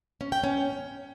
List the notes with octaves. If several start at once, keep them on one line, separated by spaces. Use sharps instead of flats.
C#4
G5
C#4